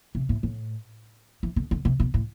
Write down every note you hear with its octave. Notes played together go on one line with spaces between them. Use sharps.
C3
A2
A2
E3
D3
D3
C3
B2
A2